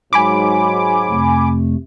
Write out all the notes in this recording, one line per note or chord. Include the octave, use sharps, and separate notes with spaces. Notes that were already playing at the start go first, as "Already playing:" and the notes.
G#2 F#3 G#5 B5 D6
F2 C3 A3